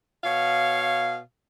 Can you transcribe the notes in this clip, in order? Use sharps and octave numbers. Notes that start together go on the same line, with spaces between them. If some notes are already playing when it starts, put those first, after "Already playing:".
B2 C#5 F5